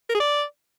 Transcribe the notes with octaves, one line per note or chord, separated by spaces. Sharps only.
A#4
G#4
D5